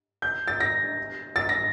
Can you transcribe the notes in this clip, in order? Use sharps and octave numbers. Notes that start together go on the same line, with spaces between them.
G6
A6
A#6
A6
A#6